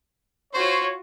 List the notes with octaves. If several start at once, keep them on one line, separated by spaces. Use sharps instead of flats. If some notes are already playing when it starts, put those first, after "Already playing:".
F4 F#4 C5 C#5